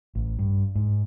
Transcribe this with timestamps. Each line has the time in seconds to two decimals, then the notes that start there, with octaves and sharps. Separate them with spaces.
0.15 A1
0.39 G2
0.75 G#2